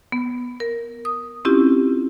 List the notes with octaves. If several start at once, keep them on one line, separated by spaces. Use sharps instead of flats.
B3
A#4
D#6
C4 C#4 E4 F4 G4